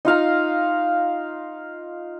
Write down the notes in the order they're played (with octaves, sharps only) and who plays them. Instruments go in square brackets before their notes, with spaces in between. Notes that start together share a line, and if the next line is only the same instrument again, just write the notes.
[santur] D#4 F4 F5 A#5